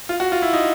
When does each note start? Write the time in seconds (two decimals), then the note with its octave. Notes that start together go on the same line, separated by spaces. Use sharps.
0.09 F4
0.20 F#4
0.32 F4
0.42 E4
0.53 D#4